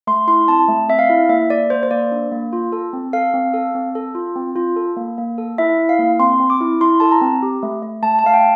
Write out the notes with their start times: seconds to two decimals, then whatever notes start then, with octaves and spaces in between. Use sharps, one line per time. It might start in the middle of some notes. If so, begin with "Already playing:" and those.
0.07 A3 C6
0.28 E4 C6
0.48 C4 A5
0.69 A3
0.89 C4 E5
0.99 F5
1.09 E4
1.29 A#3 E5
1.50 A#3 D5
1.70 A#3 C5
1.83 C5
1.91 A#3 D5
2.12 D4
2.32 A#3
2.53 F4
2.72 A4
2.93 C4
3.13 A4 F5
3.34 C4
3.54 A4
3.75 C4
3.95 A4
4.15 F4
4.36 C4
4.56 F4
4.76 A4
4.97 A#3
5.18 A#3
5.38 A4
5.58 E4 E5
5.78 E4
5.89 F5
5.99 A#3
6.20 C4 C6
6.40 C4
6.50 D6
6.61 E4
6.81 E4 C6
7.00 A4 A5
7.12 A#5
7.21 C4
7.43 G4
7.63 A3
7.83 A3
8.03 A3 A5
8.19 A5
8.24 A3 F5
8.34 G5